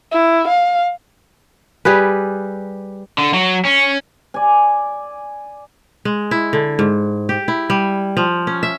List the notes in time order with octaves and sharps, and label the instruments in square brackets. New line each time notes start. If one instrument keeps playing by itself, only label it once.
[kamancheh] E4
F5
[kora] G3 G4 G#4 B4
[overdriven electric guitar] D3
F#3
C#4
[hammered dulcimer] D5 G#5
[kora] G#3
E4
D3
G#2
G4
E4
G3
F3
C#4
E5